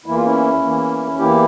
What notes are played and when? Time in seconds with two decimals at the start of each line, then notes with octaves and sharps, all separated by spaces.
0.06 E2 E3 A#3 E4
0.15 F4
0.25 C#4 E4
0.62 E2 E3 A#3
1.19 E2 E3 A#3 E4 G4